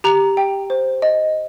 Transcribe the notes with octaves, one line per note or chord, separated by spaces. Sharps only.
G4 A#5
G5
C5
D#5